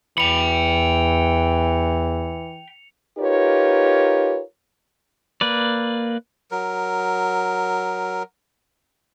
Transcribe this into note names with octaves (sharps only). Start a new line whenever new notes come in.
E2 E3 G5 B5 C#7 F7
D#4 F4 G4 A#4 B4 C#5
A#3 B4 D5
F#3 A#4